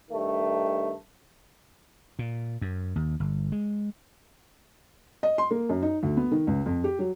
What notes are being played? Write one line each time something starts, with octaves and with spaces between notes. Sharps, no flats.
G2 D#3 A3
A#2
F#2
D#2
G1
G#3
D#5
C6
A#3
F#2
D#4
D2
B3
D#3
C#2
F2
G4
F#3